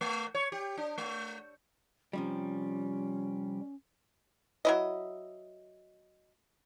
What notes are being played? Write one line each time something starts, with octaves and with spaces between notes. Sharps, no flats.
A3
C#5
G4
D4
A3
C3 F3 G3 C#4
F#3 E4 D#5